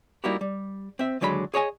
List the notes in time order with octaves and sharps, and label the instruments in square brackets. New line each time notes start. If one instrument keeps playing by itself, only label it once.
[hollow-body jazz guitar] G3 A#3 D#4 E4 F#4 G4
G3
C4 E5
D#2 D3 F#3 G#3 F4 B5
G#4 C#5 D#5 G#5